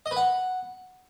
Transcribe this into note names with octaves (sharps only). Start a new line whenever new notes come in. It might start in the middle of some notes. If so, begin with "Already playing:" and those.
D#5
B4
F#5